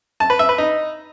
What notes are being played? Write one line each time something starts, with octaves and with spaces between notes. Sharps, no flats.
A5
B4
E5
B4
D#4